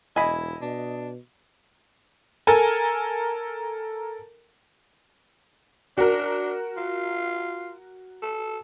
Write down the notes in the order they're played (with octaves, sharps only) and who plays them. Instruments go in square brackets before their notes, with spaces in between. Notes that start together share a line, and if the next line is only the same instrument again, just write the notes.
[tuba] E1 [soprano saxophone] E4 [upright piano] D#5 [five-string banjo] G#5 B5
[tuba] B2 [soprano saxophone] D4
[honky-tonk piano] A4 A#4 G#5
[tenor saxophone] D4 [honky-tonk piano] F#4 A#4
[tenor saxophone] F4
A4